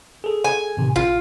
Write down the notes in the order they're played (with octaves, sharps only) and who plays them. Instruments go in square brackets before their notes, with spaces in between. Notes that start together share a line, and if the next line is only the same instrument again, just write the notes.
[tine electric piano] G#4 A4
[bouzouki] G#5
[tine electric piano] A2 C3 D#3
[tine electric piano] A#1 [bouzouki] F4